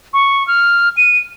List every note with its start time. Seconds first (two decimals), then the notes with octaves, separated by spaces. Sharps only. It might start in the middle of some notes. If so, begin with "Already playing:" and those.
0.13 C#6
0.47 F6
0.97 D#7